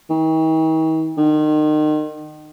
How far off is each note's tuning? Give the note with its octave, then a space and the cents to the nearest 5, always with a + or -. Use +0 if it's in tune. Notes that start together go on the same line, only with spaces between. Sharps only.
D#3 +45
D#3 -30